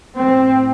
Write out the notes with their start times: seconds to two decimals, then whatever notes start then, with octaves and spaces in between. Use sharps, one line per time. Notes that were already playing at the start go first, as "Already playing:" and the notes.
0.15 A2 C4